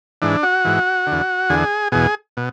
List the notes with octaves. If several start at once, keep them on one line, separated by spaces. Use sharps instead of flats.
G#2 E3 D4
F#4
G#2 E3
E2 D3
E2 D3 G#4
E2 B2 G#4
B2